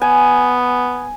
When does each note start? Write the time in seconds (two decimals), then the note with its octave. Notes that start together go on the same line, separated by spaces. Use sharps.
0.02 B3 G#5